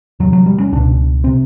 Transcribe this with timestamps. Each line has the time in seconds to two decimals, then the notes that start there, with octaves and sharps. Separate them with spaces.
0.20 E2 C3 F#3
0.33 F#3
0.46 G3
0.60 C#4
0.72 C#2 B2 D4
1.24 C3 C4